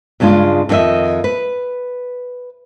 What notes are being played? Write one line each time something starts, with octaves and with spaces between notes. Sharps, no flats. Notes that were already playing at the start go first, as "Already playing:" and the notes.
G2 C#3 G#3 D4 F4
F2 D#3 F#4 D#5 E5
B4